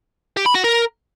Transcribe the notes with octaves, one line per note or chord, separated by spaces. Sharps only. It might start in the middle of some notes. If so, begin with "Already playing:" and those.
G4
B5
F#4
A#4